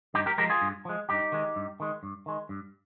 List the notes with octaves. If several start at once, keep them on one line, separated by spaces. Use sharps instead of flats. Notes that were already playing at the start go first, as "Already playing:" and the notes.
G2 D#4 G4
G4 A#4
F3 G#3 G4 A#4
F4 G#4
G2
F3 G#3
G2 D#4 G4
D#3 G#3
G2
D#3 G#3
G2
D#3 G#3
G2